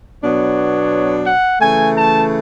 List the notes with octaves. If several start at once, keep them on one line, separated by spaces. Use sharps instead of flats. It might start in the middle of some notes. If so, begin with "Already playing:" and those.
B2 F#3 B3 D4 C#5
F#5
C#3 E3 A3 G#5
A5